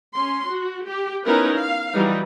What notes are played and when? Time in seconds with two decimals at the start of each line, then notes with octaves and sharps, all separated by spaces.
0.13 C#4 C6
0.51 F#4
0.86 G4
1.26 B3 C#4 D#4 E4 A#4 B4
1.57 F5
1.93 E3 F#3 G3 D#4 B4